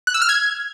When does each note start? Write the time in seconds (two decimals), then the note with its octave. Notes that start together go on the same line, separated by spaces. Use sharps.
0.07 F#6
0.14 E6
0.22 F6
0.29 G#6